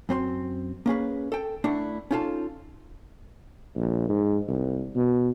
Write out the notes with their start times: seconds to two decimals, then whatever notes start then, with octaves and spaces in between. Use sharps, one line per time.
0.09 F#2 C4 A#4 C6
0.86 A#3 C#4 G#4 B4
1.32 A4 G5
1.64 A3 D4 E4 F#5
2.11 C#4 D#4 F4 A4 F5 A5
3.76 A#1
4.09 G#2
4.48 C2
4.95 B2